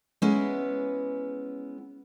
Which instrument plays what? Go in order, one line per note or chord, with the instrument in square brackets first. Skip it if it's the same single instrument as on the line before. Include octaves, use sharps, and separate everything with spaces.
[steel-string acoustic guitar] G#3 B3 C#4 E4 B4